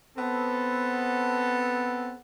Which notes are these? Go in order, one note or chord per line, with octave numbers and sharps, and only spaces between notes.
B3 C4 A4